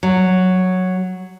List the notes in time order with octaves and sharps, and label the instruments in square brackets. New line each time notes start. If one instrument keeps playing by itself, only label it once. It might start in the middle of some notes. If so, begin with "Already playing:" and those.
[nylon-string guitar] F#3